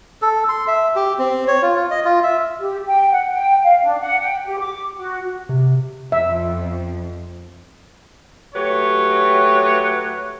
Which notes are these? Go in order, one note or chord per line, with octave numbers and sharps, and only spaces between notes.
A4
C6
E5
G4
C4
C#5
F4
F4
D#5
F4
E5
G4
G5
F#5
G5
F5
D4
F#5
G5
G4
D6
F#4
C3
F2 E5
F#3 A3 G4 B4 C#5